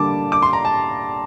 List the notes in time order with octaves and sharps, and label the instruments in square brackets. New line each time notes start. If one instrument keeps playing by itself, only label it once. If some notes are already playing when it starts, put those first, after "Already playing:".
Already playing: [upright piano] D3 G3 A#3 D4 [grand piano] A5 D6
[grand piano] D6
C6
A#5
A5